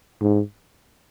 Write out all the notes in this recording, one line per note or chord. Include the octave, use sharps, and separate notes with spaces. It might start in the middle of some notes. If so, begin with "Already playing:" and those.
G#2